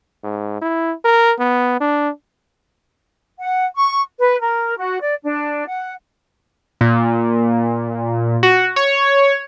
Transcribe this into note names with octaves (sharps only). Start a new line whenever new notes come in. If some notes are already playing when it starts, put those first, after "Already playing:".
G#2
E4
A#4
B3
D4
F#5
C#6
B4
A#4
F#4
D5
D4
F#5
A#2
F#4
C#5